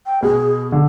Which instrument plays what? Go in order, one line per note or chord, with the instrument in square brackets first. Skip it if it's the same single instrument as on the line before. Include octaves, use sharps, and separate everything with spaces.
[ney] G5
[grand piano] B2 [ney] G#4
[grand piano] D3